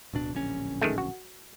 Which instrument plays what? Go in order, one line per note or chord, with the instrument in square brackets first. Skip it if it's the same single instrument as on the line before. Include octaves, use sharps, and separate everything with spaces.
[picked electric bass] D1 B2 D4
D1 A#1 C#4
[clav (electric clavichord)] D#3 G#3 A3
F#4